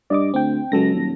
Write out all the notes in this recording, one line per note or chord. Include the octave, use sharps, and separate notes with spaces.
G2 D5 D#5 D6
D2 C4 G5
C#2 F#3 A4 A#6
D#1